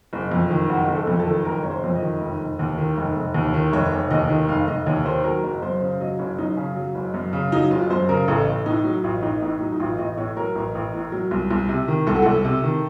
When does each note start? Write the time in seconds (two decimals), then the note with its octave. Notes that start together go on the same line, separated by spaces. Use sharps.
0.13 F#1
0.32 F2
0.51 D#3
0.69 F#1 F#4
0.88 F#1
0.95 A4
1.07 F2
1.20 A4
1.26 D#3
1.45 F#1 A#4
1.63 F#1 C#5
1.71 C5
1.84 F2
1.95 D#5
2.02 D#3
2.21 F1
2.40 F1
2.59 D#2
2.78 D#3
2.97 F1
3.16 F1
3.34 D#2
3.54 D#3
3.73 F1 C#5
3.92 F1
4.10 D#2 D#5
4.30 D#3
4.49 F1 F5
4.68 F1 D#5
4.87 D#2 C#5
5.05 D#3 C5
5.24 F#3 A#4
5.43 F#1
5.62 F#2 C5
5.82 C#3
6.00 F#3 D#5
6.19 F#1 C#5
6.38 F#2 D#4
6.57 C#3 C#4
6.76 F#3
6.95 F#1
7.14 F#2
7.33 C#3
7.52 F#3 D#4
7.71 F#1 F4
7.90 F#2 C5
8.09 C#3 A#4
8.28 A1 A4
8.47 A1
8.66 A2 D#4
8.85 F#3
9.04 A1 F4
9.22 A1 D#4
9.41 A2 D#4
9.60 F#3 D#4
9.72 D#4
9.80 A1 F4
9.98 A1 D#5
10.17 A2 C#5
10.37 F#3 A#4
10.55 A1
10.75 A1
10.93 A2
11.12 F#3
11.31 C2
11.51 C2
11.69 C3
11.88 D#3
12.07 C2 A4
12.15 F#4
12.22 C2 A4
12.45 C3
12.64 D#3